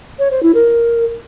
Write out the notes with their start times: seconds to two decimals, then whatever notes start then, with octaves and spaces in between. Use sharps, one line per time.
0.19 C#5
0.31 C5
0.43 E4
0.55 A#4